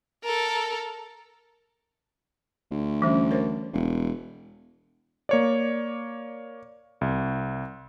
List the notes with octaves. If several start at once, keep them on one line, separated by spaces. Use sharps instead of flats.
A4 A#4
D2
E3 G3 C#4
A#4 C5 C#5
E1
A#3 C#5 D5
C2